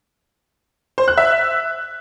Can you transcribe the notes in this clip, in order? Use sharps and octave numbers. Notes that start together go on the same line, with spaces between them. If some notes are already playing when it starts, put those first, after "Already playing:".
C5
F#6
E5